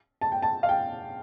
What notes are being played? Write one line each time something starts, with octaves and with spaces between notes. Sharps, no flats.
A5
G5
A5
F5
G5